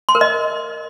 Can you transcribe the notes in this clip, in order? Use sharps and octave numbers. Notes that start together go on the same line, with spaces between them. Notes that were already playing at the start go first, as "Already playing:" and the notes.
C6
A#4
D#5